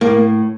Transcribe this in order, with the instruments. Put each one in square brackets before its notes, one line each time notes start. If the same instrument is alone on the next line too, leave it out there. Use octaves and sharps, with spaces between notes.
[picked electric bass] A2 [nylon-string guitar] A#3